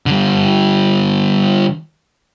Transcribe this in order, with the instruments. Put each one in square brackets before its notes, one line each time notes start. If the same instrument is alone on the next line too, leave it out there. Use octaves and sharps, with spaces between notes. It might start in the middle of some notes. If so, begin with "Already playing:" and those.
[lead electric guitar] D3 G3